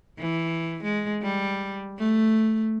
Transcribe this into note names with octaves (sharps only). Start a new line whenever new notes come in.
E3
G#3
G3
A3